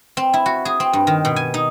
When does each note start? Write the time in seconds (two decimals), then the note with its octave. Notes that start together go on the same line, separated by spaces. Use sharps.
0.17 C4
0.34 E4
0.46 F#4
0.65 G#4
0.80 C4
0.93 G2
1.07 D#3
1.25 B2
1.36 G#5
1.54 D#4